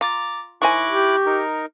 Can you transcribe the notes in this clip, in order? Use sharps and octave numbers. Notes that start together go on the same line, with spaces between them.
F4 A#5 D6 A6
D#3 E4 C5 G#5 C#6 D6 F#6 A#6
G4
D#4 A#4